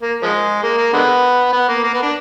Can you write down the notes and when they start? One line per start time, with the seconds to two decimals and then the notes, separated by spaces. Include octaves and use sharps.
0.02 A#3
0.23 F3 G#3
0.63 A#3
0.78 A#3
0.93 D3 G#3 B3
1.53 B3
1.68 A#3
1.83 A#3
1.93 B3
2.03 D4